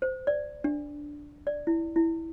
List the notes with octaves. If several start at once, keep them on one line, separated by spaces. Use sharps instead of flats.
C5
D5
D4
D5
E4
E4